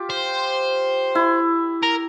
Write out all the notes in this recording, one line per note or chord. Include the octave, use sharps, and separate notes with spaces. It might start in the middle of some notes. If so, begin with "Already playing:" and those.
Already playing: F4 G4
C5
E4
A#4